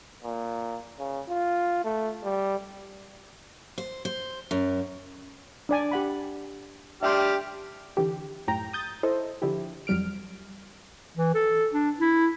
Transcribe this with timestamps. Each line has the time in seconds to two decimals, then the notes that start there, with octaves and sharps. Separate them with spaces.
0.24 A#2
0.99 C#3
1.29 F4
1.85 A3
2.24 G3
3.78 C5
4.05 C5
4.51 F#2
5.69 D4 D5 G#5
5.92 G4 F#5 B5
7.03 D4 G4 E5 G5 C6 F6
7.97 D3 E3 G4
8.48 F#2 A2 G5 A#5
8.73 D#6 G6 A6
9.03 E4 A4 C5 D#5
9.42 D3 F3 E4 G4
9.87 F2 F#3 G3 F6 D7
11.17 E3
11.35 A4
11.73 D4
12.00 E4